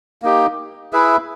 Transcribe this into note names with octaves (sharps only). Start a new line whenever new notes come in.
A#3 D#4 G4
E4 G#4 B4 E5